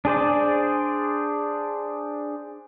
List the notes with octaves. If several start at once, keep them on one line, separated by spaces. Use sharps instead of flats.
D4 G#4 C5 D5